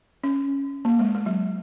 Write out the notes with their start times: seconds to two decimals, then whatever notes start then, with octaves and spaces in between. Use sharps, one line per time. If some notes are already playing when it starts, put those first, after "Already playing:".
0.24 C#4
0.85 A#3
0.99 G#3
1.15 G#3
1.26 F#3